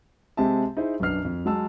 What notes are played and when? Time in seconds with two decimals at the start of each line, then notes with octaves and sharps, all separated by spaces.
0.37 C3 G#3 C4 G4 E5 A5
0.77 D#4 E4 G#4 C5
1.00 B1 F#2 B3 D4 F6 C7
1.25 F2
1.46 F#3 G#3 A5 E6